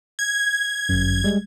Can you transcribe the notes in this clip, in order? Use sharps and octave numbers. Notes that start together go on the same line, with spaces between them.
G#6
G1 F#2
G3 G#3